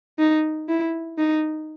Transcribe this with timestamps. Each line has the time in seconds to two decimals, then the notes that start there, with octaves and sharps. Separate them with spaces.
0.19 D#4
0.68 E4
1.18 D#4